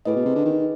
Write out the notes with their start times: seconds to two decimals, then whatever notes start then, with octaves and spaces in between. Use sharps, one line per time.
0.05 A2 G#4 B4 D#5
0.16 B2
0.25 C3
0.35 D3
0.45 D#3